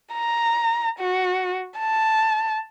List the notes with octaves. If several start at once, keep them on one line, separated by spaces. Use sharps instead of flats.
A#5
F#4
A5